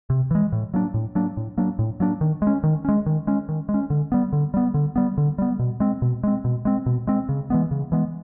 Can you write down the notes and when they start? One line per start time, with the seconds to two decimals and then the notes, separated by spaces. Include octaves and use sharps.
0.10 C3
0.31 E3 G#3
0.52 A2
0.74 F#3 A#3 D4
0.94 A2
1.15 F#3 A#3 D4
1.37 A2
1.58 F#3 A#3 D4
1.79 A2
2.00 F#3 A#3 D4
2.21 D#3
2.42 G#3
2.47 C#4
2.64 D#3
2.85 G#3 C#4
3.06 D#3
3.27 G#3 C#4
3.49 D#3
3.69 G#3
3.74 C#4
3.90 D3
4.12 G3 B3
4.33 D3
4.54 G3 B3
4.74 D3
4.96 G3 B3
5.18 D3
5.38 G3 B3
5.59 B2
5.80 G#3 C4
6.02 B2
6.23 G#3 C4
6.45 B2
6.65 G#3 C4
6.86 B2
7.07 G#3 C4
7.29 C#3
7.50 E3 G#3 B3
7.71 C#3
7.92 E3 G#3 B3